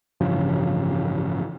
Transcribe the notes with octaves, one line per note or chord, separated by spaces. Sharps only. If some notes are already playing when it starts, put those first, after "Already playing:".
A1 G2 C#3 F3